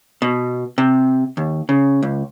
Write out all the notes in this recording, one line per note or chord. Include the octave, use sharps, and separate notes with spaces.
B2
C3
D#2
C#3
C#2